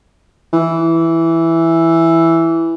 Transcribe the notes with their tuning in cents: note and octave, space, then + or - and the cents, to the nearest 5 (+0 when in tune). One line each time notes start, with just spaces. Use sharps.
E3 +0